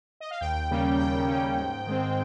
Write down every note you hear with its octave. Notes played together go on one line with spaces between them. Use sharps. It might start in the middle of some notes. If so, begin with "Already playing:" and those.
D#5
F5
D#2 G5
C#3 G3 A#3 C#4
D#2 G5
C#3 G3 A#3 C#4
G#2
D#3 G#3 C4